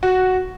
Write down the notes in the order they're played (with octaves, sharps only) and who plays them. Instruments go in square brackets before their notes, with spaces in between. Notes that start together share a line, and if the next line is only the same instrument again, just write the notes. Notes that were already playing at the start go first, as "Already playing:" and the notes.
[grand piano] F#4